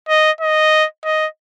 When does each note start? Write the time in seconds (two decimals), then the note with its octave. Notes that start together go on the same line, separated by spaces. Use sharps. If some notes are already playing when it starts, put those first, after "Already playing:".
0.09 D#5
0.41 D#5
1.05 D#5